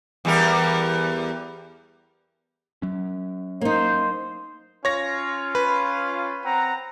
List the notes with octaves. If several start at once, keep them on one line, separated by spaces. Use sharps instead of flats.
E2 G3 A#4
F#3 C#4
A#3 D#4 C5
C#4 F4 C#5 A#6
B4
C4 F#5 A#5